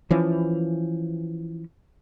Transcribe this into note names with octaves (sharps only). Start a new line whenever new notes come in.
E3 F3 C#4